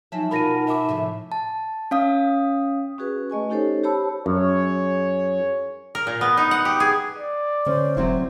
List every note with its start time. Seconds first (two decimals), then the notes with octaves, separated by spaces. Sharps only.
0.12 F3 F#3 D#4 E5 G#5 A5
0.31 B2 F4 F#4 A#4 B5 A#6 D#7
0.67 E5 B5 D6
0.89 A2 C3 F3
1.32 A5
1.91 C#4 F5 D#6
2.98 C#4 F#4 G#4 B4
3.30 A3 D#5 G#5 C#6
3.50 C#4 D#4 G4 A4 C5 C#5
3.84 G4 C5 C#5 A5 B5 E6
4.26 F#2 G#4 C#5
5.95 A#4
6.07 A#2
6.21 B3
6.37 D#4
6.51 F#5
6.65 G4
6.80 G#4
7.18 D5
7.66 D3 C#4 C5
7.97 F1 F#3 C4 E4